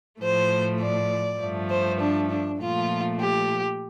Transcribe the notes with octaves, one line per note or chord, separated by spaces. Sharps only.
A2 F3 A3 C5
D5
G2 F3 A3
C5
D4
D4
A#2 F3 A3 F4
G4